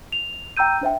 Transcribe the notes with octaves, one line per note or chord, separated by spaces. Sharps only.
F7
G5 A#5 E6 G6 D#7
D4 C5 E5 G5